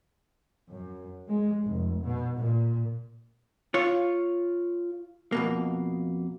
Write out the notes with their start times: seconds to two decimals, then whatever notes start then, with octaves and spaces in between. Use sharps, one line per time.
0.68 F#2
1.28 G#3
1.63 F1
2.04 B2
2.37 A#2
3.74 F4 C#5
5.32 F2 B2 A#3